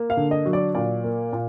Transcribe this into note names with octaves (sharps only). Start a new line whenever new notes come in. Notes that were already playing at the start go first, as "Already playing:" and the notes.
Already playing: A#3
F5
D3
D#5
F#3
D5
A#2 D5
A#3
A#2